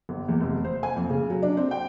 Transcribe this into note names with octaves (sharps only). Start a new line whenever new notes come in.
G1
E2
F1
C5
G#5
F2
C#3
F#3
D4
C4
G5